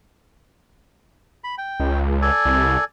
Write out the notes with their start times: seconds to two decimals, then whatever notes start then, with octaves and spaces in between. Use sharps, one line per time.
1.44 B5
1.58 G5
1.80 C#2
2.22 A4 D5 G#5
2.46 C2